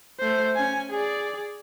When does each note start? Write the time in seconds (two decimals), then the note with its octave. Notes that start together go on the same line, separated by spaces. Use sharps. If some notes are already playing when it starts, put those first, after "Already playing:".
0.19 A3 C5
0.55 C#4 G#5
0.90 G#4 D5